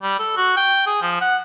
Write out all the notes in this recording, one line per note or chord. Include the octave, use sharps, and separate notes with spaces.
G3
A4
F#4
G5
G#4
F3
F#5